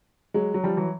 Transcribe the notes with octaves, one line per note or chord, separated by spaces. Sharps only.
F#3 G#3
F#3
F3 G3
E3 F#3